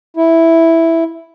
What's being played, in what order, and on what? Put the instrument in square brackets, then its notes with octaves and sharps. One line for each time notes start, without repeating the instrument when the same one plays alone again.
[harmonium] E4